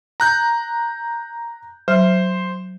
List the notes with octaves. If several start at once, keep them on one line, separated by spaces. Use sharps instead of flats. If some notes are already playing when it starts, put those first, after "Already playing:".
A#5 F#6 G6
F#3 C5